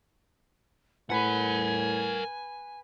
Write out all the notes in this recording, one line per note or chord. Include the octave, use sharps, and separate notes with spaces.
A2 A#4 B4 F#5 G#5 B5